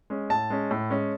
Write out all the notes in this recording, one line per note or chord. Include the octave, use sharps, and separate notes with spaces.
G#3 C#4
A2 A5
G#3 C#4
A2
G#3 C#4